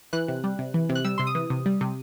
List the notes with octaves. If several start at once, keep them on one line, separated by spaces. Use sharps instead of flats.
E3 F#6
C3
G3
C3
E3
C3
F#6
G3 E6
C3 C6
D#6
E3
C3
G3
C3